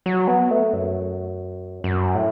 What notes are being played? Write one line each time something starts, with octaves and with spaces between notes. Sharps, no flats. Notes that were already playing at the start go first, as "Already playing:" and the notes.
F#3
B3
A3
F#2
F#2
A2